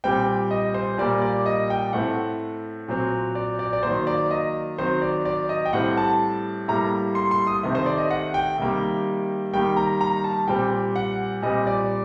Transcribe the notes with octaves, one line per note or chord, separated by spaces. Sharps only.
A#2 G3 C4 G5
D#5
C5
A#2 G3 A#3 D5
D5
D#5
G5
A2 A3 C4 F#5
A#2 F#3 C4
D5
D5
D5
D#3 F#3 A#3 C5
D5
D#5
D#3 F#3 C4 C5
D5
D5
D#5
G5
A2 G3 C4 F#5
A5
A2 G3 A#3 A#5
C6
C6
D#6
C3 D#3 A3 C4
C5
D5
D#5
F#5
G5
C3 D#3 G3 A#3
D#3 G3 A#3 G5
A#5
A#5
A5
A#2 G3 C4 G5
F#5
A#2 G3 C4 D#5
D5